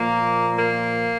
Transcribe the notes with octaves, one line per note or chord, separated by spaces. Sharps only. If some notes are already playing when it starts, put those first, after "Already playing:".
Already playing: A#2 F3 A#3
A#3